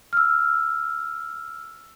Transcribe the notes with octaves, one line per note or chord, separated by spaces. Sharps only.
E6 F6